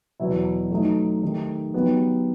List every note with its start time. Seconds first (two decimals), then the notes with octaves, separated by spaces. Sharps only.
0.20 E2 B2 F#3 B3 E4
0.71 F#3 A3 D#4
1.23 D#3 A3 D#4 G4
1.74 F#3 B3 D#4 G4